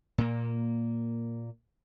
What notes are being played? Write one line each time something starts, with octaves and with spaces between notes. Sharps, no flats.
A#2 A#3